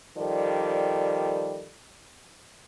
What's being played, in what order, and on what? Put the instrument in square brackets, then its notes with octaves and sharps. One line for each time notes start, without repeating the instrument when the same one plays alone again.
[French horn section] D#3 F3 G3 A4 D5